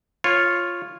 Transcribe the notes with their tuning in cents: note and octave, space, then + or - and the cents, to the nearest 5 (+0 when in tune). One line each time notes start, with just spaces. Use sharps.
F4 +0 C#5 -10